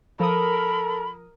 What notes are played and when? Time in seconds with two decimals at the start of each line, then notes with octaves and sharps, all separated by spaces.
0.20 F3 A4 A#4 B5 D#6